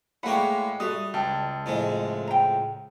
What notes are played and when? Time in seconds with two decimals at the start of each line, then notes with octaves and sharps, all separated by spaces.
0.23 A2 G#3 A#3 C#5 F#5 G5 B5
0.80 G3 F#4 A4 E5 D#6
1.14 C#2 G5 A5
1.66 F2 A2 G#3
2.27 G5 A#5